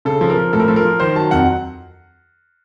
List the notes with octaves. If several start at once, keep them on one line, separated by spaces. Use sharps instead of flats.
C#3 A4
F3
A#4
F3
A2 A4
A#4
F3 A4
A#4
F3
D#3 C5
F#3 A5
F2 F#5